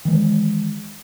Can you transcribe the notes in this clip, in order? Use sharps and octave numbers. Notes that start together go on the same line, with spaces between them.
D#3 E3 G#3